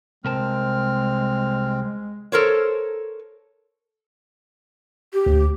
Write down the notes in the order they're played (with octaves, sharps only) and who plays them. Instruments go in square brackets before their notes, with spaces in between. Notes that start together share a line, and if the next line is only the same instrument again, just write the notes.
[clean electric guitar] C2 A#4 A5 [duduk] G#3 [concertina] C4 [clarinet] F6
[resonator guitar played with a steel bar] A4 A#4 C5 C#5
[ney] G4
[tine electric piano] D2